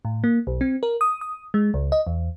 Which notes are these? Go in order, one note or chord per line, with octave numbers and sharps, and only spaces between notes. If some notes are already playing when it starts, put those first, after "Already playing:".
A2
A#3
B1
C4
A#4
D#6
D#6
G#3
C#2
D#5
E2